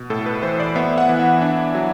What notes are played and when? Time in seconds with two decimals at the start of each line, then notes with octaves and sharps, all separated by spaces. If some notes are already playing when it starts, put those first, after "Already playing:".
Already playing: B2
0.10 A2 A4
0.26 B4
0.43 E3 C5
0.60 D5
0.76 B3 E5
0.98 F#5
1.09 E3
1.20 E5
1.42 D4
1.75 F#3